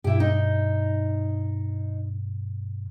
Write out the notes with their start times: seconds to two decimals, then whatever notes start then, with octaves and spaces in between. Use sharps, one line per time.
0.04 G2 B2 E4 G4
0.20 D#4